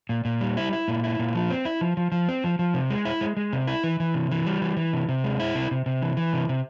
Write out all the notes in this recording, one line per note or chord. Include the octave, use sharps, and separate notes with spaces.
A#2
A#2
G3
E4
E4
A#2
E4
A#2
F3
C4
E4
F3
F3
F3
C4
F3
F3
C3
G#3
E4
G#3
G#3
C3
E4
E3
E3
C3
E3
G3
E3
E3
C3
C3
G#3
E4
C3
C3
C3
E3
E3
C3
C3